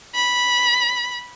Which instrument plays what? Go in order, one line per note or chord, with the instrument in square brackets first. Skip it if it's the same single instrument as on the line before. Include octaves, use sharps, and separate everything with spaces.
[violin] B5